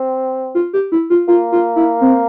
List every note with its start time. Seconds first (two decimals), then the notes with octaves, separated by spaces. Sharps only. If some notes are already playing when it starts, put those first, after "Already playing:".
Already playing: C4
0.55 F4
0.73 G4
0.92 E4
1.10 F4
1.28 A#3 F4
1.52 F4
1.76 E4
2.01 C4